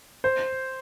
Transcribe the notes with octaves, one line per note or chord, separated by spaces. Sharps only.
C5